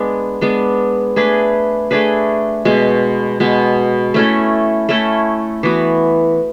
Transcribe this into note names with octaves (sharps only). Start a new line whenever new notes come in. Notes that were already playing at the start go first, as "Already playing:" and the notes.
Already playing: G#3 B3 D4
G#3 B3 D4
A3 D4 G#4 B4
A3 D4 G#4 B4
B2 G#3 B3
B2 G#3 B3
A3 C#4 E4 A4
A3 C#4 E4 A4
E3 B3 F#4